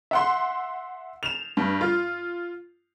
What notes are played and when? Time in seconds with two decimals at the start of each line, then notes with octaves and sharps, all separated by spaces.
0.11 E5 F#5 C6
1.23 E7 F7
1.57 G2
1.81 F4